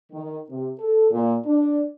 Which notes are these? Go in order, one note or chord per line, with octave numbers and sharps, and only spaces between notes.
D#3
C3
A4
A#2
D4